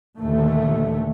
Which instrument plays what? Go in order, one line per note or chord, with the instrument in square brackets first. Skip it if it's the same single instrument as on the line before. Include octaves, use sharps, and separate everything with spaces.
[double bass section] D#2 A#2 D3 E3 A3